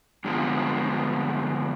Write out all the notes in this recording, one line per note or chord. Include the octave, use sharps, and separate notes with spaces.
G2 D3 F3 G#3 B3